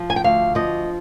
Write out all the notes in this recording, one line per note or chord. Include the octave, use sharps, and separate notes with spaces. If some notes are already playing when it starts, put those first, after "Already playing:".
Already playing: F3
G#5
G5
D2 F5
F3 D#5